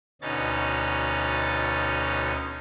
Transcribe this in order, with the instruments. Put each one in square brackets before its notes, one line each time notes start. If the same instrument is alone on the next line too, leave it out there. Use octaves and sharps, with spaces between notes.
[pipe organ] D2 B2 C#4 D#4 A6